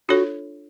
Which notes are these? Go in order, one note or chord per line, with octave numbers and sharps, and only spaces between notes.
D4 F4 F#4 A4 C#5